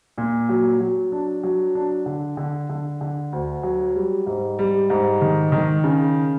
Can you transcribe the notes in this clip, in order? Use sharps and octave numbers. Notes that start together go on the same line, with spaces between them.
A#2
F#3
F#3
D4
F#3
D4
D3
D3
D3
D3
D2
F#3
G3
G#2
G3
G#2
D#3
D#3
C#3